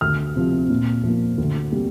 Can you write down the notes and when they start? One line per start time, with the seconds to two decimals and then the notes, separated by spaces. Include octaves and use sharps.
0.01 D2 F6
0.35 C3 F3
0.70 A#2
1.04 F3 A#3
1.38 D2
1.72 C3 G3 A#3